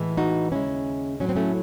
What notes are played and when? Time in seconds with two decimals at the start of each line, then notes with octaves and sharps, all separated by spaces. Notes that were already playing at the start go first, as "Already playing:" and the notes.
Already playing: A2 E3 G#3
0.17 D#4 F#4
0.52 D#2 C#3 G#3 C#4 E4
1.20 A2 F#3 C#4
1.29 C4
1.36 A3 C#4